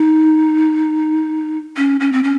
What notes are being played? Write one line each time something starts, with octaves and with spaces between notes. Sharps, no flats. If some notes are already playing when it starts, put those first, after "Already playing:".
Already playing: D#4
C#4
C#4
C4
C#4